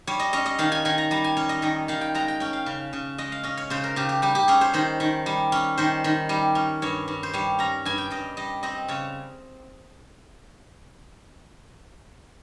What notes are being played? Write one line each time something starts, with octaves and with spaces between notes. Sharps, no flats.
G3 C#5
D#5
C#4 D#5
D#5
D#3 F5
G#5
D#3 G#5
A#5
G3 A#5
G#5
C#4 C#5
D#5
D#3 D#5
D#3 F5
G5
G#3 A#5
G5
C#4 G5
F5
C#3
C#3
G#3 D#5
F5
C#4 D#5
C#5
C#3 C5
A#4
C#3 G4
G4
G3 G4
G4
C#4 G#4
C5
D#3 C5
D#3
G3
C#4
D#3 C5
D#3
G3
C#4
G2 C#5
G2
C5
G3 C#5
C#4 A#5
G2 G#5
G5
G2 D#5
G3 D#5
C4 D#5
C#3 C#5